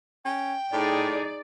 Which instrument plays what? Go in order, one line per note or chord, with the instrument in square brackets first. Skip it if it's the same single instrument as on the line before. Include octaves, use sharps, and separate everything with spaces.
[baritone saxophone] C#4 [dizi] G5
[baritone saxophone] A2 [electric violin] D#4 G#4 [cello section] D5